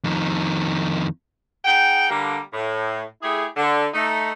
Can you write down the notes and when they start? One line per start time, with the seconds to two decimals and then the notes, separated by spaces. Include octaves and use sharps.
0.04 F2 D#3
1.65 D#4 G#4 F#5 G5
2.09 D3 G3 A#3
2.53 A2
3.23 A3 E4 G4 G#4
3.57 D3
3.94 A3 D#4